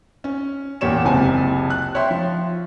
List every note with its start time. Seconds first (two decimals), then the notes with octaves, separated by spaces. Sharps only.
0.24 C#4
0.81 E2 A#2 G4 C#5 E7
1.04 F#1 C#2 C3 G#5 A5
1.70 F#6
1.95 C#5 E5 G5 C6
2.11 F3